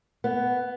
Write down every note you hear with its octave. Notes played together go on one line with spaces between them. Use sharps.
B3